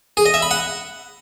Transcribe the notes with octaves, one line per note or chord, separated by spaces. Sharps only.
G#4
D#5
E5
B5
F#5